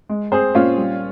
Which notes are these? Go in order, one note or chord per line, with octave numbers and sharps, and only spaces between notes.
G#3
C4 G#4 C5
A#2 C#4 F4
G3